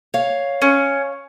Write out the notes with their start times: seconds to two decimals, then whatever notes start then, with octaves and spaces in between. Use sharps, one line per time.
0.14 C#5 F5
0.62 C#4